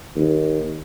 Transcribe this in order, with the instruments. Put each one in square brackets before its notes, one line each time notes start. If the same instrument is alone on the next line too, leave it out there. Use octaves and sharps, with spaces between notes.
[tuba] D#2